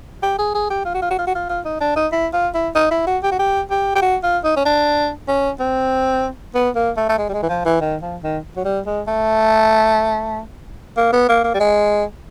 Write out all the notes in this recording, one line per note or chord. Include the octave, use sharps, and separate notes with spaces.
G4
G#4
G#4
G4
F4
F#4
F4
F#4
F4
F#4
F4
F4
D#4
D4
D#4
E4
F4
E4
D#4
E4
F#4
G4
F#4
G4
G4
G4
F#4
F4
D#4
C#4
D4
C#4
C4
B3
A#3
A3
A3
G#3
G3
G#3
E3
F3
E3
D#3
F3
D#3
F#3
G3
G#3
A3
A#3
B3
A#3
A#3
G3
G#3